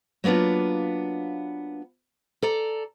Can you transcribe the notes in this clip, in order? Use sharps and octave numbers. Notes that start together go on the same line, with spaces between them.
F#3 A#3 B3 D4 F4
A4 D5 A#5